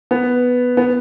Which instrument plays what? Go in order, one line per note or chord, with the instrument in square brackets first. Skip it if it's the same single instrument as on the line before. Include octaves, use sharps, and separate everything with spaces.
[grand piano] B3
B3